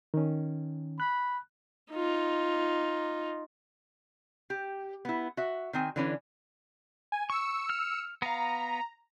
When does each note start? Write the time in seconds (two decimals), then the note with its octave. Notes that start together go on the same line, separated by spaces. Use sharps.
0.14 D#3 C#4
1.00 B5 F#6
1.92 D#4 F4
4.50 G4
5.05 B3 E4
5.37 F#4 E5
5.73 D#3 C4 G#5
5.96 D3 E3 C#4
7.12 G#5
7.30 C#6 E6 C#7
7.69 F6
8.22 B3 F5 A#5